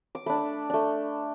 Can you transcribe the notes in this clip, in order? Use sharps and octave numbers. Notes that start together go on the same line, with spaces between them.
D6
A3 D4 B5
A3 D4